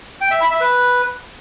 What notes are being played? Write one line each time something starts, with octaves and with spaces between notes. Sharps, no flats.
G5
E5
B5
E5
B4